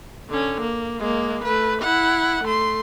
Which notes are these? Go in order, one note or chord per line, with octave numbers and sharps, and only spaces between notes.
D3 C#4
A#3
G#3 A#3
A3 B4
E4 F#5
A3 C6